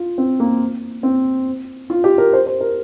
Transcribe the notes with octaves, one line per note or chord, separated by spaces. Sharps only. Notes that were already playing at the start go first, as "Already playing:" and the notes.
Already playing: F4
C4
A#3
C4
F4
G4
A#4
C5
C5
A#4